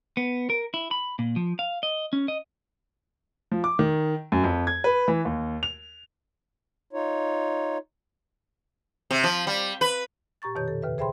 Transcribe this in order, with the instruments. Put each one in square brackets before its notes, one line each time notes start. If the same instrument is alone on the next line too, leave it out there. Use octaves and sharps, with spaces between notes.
[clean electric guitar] B3
A#4
E4
B5
A#2
F3
F5
D#5
C#4
D#5
[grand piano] F3
D6
D#3
F#2
F2
G#6
B4
E3
D#2
F7
[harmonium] D#4 F4 C#5
[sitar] C3
F3
G3
B4
[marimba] A#2 G4 A#5 C#6 A6
F2 B2 D#3 G4 C#5 G6
A4
D#2 C#3 B4 E5
G#4 C5 E5 G5 B5 C6